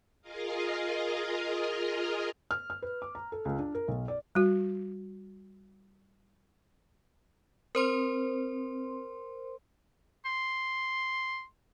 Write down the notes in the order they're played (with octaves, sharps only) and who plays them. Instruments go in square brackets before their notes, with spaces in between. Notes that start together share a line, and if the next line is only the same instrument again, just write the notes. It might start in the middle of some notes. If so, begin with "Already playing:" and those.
[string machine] F4 G#4 A#4 D#5 F5
[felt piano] F6
F6
B4
D6
A#5
A4
C#2
D4
A#4
B1
D5
[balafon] G3 F#4
[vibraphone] C4 [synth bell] A#4 C5 C6
[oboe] C6